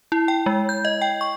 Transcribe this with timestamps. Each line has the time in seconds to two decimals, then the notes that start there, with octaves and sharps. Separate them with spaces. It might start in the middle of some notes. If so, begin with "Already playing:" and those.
0.12 E4
0.28 G5
0.46 G#3
0.69 G6
0.85 D#5
1.02 G5
1.21 C#6